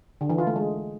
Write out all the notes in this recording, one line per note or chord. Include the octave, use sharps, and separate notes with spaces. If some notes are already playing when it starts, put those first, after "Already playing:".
D3
E3
F4
A3
G#3